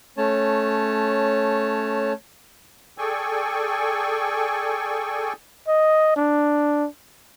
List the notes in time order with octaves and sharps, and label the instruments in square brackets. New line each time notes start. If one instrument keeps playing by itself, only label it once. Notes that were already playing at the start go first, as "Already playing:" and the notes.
[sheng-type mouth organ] A3 C#4 C#5 A5
[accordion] G#4 A4 D5 G5 G#5 C#6
[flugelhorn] D#5
D4